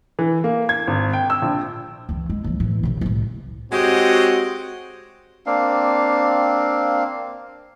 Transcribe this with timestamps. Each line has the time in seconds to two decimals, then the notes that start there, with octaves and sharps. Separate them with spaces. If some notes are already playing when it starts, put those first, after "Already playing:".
0.19 E3
0.44 A#3
0.69 G#6
0.87 G#1
1.13 G5
1.30 E6
1.42 A#1
2.09 C#2 E3
2.30 G#3
2.44 D#2 F3
2.60 A2 E3
2.83 F#2 C3
3.01 C2 A2
3.72 G#3 C4 F#4 G4 C#5 D#5
5.46 A#3 C4 D4 F5